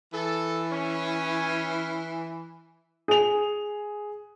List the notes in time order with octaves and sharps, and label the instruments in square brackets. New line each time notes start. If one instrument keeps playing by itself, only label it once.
[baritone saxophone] E3 [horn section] A4
[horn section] C#4
[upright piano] G#4 F7